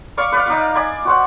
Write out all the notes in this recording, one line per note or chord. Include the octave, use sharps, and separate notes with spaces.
D5 F5 B5 C#6
B4 D5 F5
D#4 D5 F5
D5 G#5 B5
F#4 C5 F#5